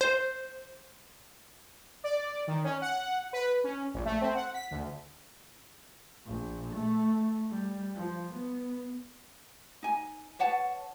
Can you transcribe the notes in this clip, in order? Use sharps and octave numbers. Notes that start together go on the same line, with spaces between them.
C5
D5
D#3
C#4
F#5
B4
C#4
A#1
A3
C4
F#5
B6
D2
A#1
A3
G3
F3
B3
D#4 G#5
B4 C#5 F#5 A5